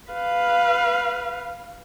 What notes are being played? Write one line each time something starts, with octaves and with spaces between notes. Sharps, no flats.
B4 F5